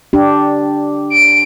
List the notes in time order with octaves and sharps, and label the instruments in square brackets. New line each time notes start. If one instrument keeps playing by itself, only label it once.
[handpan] D4 G4
[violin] D7